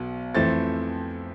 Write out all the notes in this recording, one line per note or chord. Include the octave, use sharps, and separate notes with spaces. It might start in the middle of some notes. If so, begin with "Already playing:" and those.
Already playing: B1 B2 B3
F2 E3 A3 C4 A6